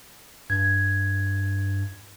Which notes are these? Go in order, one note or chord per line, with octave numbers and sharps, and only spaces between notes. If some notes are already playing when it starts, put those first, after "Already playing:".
G2 G#6